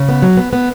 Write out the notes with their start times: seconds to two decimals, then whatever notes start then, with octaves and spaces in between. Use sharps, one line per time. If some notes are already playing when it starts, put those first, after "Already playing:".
Already playing: C#3
0.09 B3
0.22 F#3
0.37 B3
0.53 B3